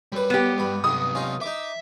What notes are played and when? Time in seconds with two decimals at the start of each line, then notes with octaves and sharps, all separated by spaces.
0.12 F#2 G3 B4
0.30 B3 G4
0.58 G2 B5
0.84 C3 F#3 D#6
1.15 C#4 D#4 F4
1.41 D#4 E5 D6